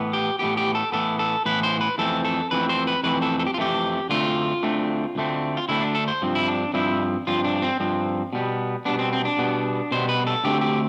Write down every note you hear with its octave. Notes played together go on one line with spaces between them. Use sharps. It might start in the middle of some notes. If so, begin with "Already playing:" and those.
Already playing: A2 E3 B3
G4
A2 E3 B3 G4
G4
A4
A2 E3 B3 A4
A4
A2 E3 B3 B4
C5
B4
F2 E3 A3 C4 A4
A4
F2 E3 A3 C4 B4
C5
B4
F2 E3 A3 C4 B4
A4
A4
G4
F4
F2 E3 A3 C4 G4
D2 D3 A3 C4 F4
D2 D3 A3 C4
D2 D3 A3 C4
F4
D2 D3 A3 C4 E4
D4
A4
C5
G2 F3 C4
E4
D4
G2 F3 C4 E4
G2 F3 C4 F4
D4
C4
G2 F3 C4
B2 G3 B3
B2 G3 B3 D4
C4
C4
D4
B2 G3 B3
B2 G3 B3 C5
B4
A4
D2 D3 A3 C4 G4
G4